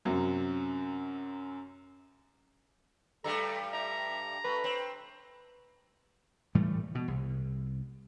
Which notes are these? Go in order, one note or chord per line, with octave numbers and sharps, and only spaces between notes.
F#2 C3 F#3
G2 G3 A3 A4 A#5
E5 A#5
A3 B4
C4
A2 E3 G3 A3
B2
C2